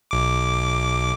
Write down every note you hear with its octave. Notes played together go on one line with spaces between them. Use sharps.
B1 D6